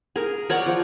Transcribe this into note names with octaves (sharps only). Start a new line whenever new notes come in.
G#4 A#4
A#4 C#5 D5 F#5
F3